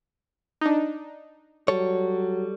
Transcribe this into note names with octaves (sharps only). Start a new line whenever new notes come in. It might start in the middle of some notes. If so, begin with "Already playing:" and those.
D4 D#4
F#3 G3 A4 C#5